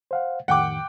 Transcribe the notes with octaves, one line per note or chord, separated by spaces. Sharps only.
C5 F5 F#5
F2 A2 D#3 F#5 G5 D6